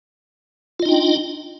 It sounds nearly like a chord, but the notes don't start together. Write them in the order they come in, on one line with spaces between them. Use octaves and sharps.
F4 D#5 D#4 G5 D4